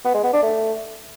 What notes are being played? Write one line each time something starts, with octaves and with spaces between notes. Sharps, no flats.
B3
G#3
B3
D4
A3